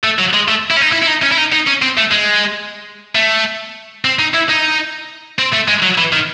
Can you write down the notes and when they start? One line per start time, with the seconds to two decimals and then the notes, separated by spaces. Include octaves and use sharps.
0.04 A3
0.19 F#3
0.33 G#3
0.48 A3
0.71 E4
0.77 C#4
0.82 D#4
0.93 E4
1.03 E4
1.08 D#4
1.23 C#4
1.32 E4
1.38 D#4
1.52 D#4
1.67 C#4
1.82 C4
1.97 A3
2.11 G#3
3.15 A3
4.05 C4
4.19 D#4
4.34 E4
4.49 D#4
5.39 C4
5.53 A3
5.68 G#3
5.83 F#3
5.98 E3
6.13 D#3